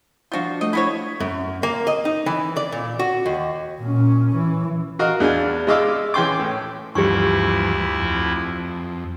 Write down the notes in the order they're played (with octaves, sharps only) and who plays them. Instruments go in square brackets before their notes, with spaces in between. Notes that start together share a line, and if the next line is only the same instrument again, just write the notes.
[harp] F3 D4 G6 [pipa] F4 F#4
[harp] A3 [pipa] D#5
[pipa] E4 F#4 C#5
[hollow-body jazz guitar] F#2
A#3
D#5
D#4
E3
D5
A#2
F#4
D#2
[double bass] A#2 C#4
E3
[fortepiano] F#4 A#4 D#5 F5
E2 D4 F5 G#5
G#3 E4 D#5 F5 D6 E6
E3 C#4 G5 C6 D6
A2
[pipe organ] D2 E4 [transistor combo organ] G2 E3 F3 [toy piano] G4 C#6
[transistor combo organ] F2